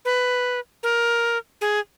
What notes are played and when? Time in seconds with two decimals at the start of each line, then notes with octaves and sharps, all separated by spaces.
0.05 B4
0.83 A#4
1.61 G#4